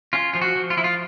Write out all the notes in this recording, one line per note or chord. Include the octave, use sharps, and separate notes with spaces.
C#4 F4
F3 F4
F#4
F3
F4
F3 E4
F4